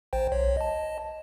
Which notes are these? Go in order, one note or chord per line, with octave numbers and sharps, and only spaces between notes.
A1 C5 G5
B1 C#5
D#5 A5